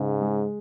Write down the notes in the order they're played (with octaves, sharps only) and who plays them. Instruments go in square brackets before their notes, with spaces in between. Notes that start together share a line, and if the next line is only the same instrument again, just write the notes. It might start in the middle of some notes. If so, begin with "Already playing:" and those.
Already playing: [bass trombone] G#2 [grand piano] C#3
[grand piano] G#3